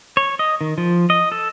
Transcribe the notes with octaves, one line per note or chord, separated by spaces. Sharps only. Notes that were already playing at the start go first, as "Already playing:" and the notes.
C#5
D#5
D#3
F3
D#5
A4